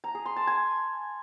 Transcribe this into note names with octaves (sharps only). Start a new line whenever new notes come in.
A#5
G#4
C6
A5
G#5